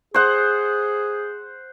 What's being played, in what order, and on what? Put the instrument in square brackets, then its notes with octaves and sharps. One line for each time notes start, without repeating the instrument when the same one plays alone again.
[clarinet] G#4 [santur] C5 F#5